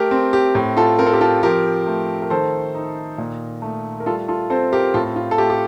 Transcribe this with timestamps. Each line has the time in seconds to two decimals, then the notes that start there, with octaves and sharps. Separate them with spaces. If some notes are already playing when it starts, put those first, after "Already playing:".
Already playing: A3 G4 A#4
0.11 C4
0.33 G4
0.55 A2
0.77 F4 A4
0.99 C4 A#4
1.06 A4
1.13 G4 A#4
1.21 F4 A4
1.43 F3 G4 A#4
1.87 A3
2.22 A#4
2.30 D#3 A4 C5
2.75 D#4
3.18 A#2
3.62 A3
4.00 A#4
4.06 G3 F4 A4
4.28 F4 A4
4.50 C4 A4 C5
4.72 G4 A#4
4.94 A2 F4 A4
5.16 F4
5.31 A4
5.38 A3 G4
5.50 G4